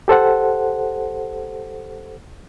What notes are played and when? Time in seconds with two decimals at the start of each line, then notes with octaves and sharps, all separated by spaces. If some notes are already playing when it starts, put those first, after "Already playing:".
0.08 G4 A4 C5 F#5